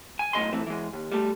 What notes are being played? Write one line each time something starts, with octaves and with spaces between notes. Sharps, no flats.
G#5
B1 A2 F3 D#5 G#5 C6
E3 A3 C4
E3 G#3
D#2
G3 A3